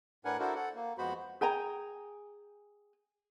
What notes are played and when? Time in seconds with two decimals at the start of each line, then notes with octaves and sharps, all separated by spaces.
0.25 A2 D4 A#4 B4 F#5 G#5
0.40 D4 E4 F#4 A4 A#4 C5
0.55 A4 F#5
0.75 A#3
0.98 F2 G#3 B3 F#4 C5 B5
1.41 G#4 G5 G#5 A#5